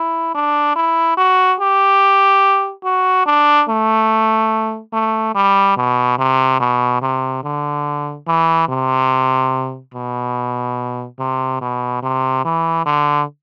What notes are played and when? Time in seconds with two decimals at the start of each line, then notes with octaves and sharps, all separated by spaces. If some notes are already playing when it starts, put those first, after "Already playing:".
Already playing: E4
0.35 D4
0.76 E4
1.17 F#4
1.60 G4
2.84 F#4
3.26 D4
3.69 A3
4.93 A3
5.35 G3
5.77 B2
6.19 C3
6.60 B2
7.02 C3
7.43 D3
8.27 E3
8.68 C3
9.94 B2
11.19 C3
11.61 B2
12.03 C3
12.45 E3
12.86 D3